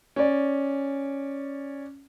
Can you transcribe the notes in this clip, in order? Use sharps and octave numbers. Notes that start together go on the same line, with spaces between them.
C#4 D5